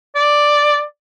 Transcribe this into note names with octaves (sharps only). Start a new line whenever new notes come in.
D5